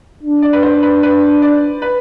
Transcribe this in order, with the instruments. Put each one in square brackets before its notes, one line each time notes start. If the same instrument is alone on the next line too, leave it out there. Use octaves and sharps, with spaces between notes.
[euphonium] D4
[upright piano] D5
B4
C5
B4
B4
D5
B4